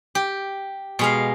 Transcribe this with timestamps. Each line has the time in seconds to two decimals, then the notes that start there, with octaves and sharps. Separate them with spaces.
0.15 G4
0.99 B2 G#3 F5